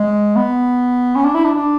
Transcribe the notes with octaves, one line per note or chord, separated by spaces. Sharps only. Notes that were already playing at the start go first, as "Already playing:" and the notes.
Already playing: G#3
B3
C#4
D4
E4
D4
D4